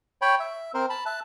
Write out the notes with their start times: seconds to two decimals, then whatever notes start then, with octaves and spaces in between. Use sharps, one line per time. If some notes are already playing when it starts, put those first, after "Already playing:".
0.22 C#5 G5 B5
0.40 E5
0.74 C4 A#4 C5
0.90 A5 B5
1.06 E5 A5 F#6